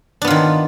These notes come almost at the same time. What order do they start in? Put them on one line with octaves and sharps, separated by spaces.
D4 B3 F4 D#3